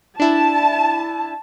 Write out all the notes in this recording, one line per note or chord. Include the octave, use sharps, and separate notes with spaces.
D4 E4 A5